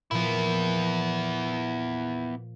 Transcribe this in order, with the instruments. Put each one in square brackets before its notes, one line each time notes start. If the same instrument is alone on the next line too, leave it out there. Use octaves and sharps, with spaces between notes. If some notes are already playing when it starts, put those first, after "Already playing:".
[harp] A#2 F3 [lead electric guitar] B3 E4